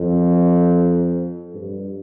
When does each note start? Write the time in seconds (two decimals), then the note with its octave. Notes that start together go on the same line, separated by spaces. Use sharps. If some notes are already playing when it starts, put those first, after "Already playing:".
Already playing: F2
1.54 G2